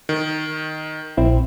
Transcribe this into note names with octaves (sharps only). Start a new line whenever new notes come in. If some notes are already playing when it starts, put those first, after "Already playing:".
D#3
A#1 C4 E4